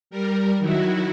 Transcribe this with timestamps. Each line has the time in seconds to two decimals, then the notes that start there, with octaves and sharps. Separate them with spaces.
0.10 G3 A#4
0.59 D#3 F#3 E4 F#4